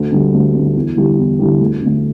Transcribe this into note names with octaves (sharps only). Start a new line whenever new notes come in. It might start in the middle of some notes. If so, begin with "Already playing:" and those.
Already playing: D2
D3 G3
D2
D3 G3
E2
D3 G3 E4 G4
E2
D3 G3 E4 G4
D2
D3 A3